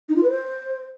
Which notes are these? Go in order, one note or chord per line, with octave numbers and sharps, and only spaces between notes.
D#4
F4
B4
C5